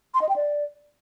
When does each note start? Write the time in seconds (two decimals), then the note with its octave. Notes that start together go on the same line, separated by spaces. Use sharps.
0.14 C6
0.21 D#5
0.29 G5
0.36 D5